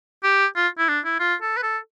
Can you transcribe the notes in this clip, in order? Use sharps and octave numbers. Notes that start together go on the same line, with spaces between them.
G4
F4
E4
D4
E4
F4
A4
B4
A4